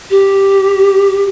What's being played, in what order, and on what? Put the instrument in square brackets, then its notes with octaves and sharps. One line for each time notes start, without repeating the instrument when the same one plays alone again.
[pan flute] G4